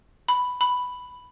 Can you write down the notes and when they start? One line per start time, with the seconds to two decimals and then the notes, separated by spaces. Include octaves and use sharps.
0.28 B5
0.61 B5